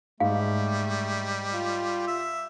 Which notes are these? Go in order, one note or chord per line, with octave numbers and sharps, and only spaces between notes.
G#2 G3 A3 F5
F4
E5